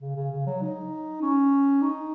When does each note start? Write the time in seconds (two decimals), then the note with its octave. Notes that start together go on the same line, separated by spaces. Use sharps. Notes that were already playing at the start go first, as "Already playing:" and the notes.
0.01 C#3
0.16 C#3
0.31 C#3
0.46 F#3
0.62 D#4
1.22 C#4
1.82 D#4